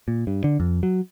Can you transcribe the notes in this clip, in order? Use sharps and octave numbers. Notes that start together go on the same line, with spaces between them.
A#2
G2
D3
F2
F#3